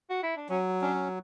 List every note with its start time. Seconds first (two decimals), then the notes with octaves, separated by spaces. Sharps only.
0.10 F#4
0.23 E4
0.37 D4
0.49 F#3 C#4
0.82 C#4 D4